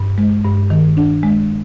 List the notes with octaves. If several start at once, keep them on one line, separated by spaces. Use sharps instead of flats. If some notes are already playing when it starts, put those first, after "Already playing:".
Already playing: G2
G#3
G2
D#3
D4
G#3